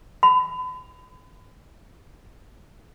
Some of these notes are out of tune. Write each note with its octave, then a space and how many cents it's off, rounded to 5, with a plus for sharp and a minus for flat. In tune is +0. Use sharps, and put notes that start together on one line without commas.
B5 +35